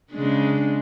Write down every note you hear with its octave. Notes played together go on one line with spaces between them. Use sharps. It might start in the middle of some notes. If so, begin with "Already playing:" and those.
C#3 G#3 D4